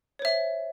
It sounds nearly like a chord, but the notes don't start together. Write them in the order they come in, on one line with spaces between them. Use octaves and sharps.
C#5 C5 E5